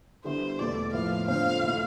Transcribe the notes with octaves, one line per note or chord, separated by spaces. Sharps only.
D3 G3 B3 E4 C5
E2 B2 A3 D5
A2 F3 B3 E4 F5
F2 D3 A3 C4 F5
B2 A3 E4